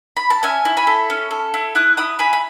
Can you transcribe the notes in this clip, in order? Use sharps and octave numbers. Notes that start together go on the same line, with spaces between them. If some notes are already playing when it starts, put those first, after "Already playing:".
B5
A5
C#4 E5 G#5
E4
G#5 B5
A4
C#4
A4
E4
E4 D#6 F#6
E4 B5 D#6
E4 G#5 B5
B5